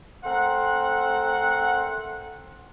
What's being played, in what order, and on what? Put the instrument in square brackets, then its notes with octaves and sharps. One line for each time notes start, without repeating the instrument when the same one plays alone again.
[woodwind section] A3 C4 A#4 C5 F#5